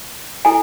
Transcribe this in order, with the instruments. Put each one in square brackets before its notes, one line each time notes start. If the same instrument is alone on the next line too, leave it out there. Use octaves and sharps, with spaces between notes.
[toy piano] E4 A4 G#5